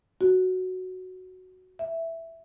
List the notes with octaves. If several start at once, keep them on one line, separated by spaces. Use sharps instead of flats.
F#4
E5